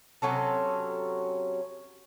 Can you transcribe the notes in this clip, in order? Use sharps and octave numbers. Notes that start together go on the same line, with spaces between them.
C3 F#3 C#4 A4